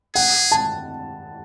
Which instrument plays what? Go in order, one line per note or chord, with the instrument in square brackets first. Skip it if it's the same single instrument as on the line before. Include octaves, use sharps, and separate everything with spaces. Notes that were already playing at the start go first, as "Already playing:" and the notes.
[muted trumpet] G#4 [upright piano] F#5
[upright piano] A5